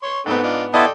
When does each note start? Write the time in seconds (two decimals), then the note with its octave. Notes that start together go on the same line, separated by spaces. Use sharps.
0.03 C#5 C6 C#6
0.26 G#2 A3 B3 C4 D#4
0.43 D4 D#4 F4
0.74 B3 E4 A4 D5 D#5 G5 A5 C6